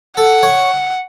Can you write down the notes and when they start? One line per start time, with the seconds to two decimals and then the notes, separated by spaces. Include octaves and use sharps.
0.17 A4 F#5
0.43 C#5